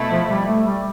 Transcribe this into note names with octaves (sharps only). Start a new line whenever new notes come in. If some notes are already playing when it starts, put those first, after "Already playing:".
Already playing: B2 A3 E4
F3
G3
A3
G3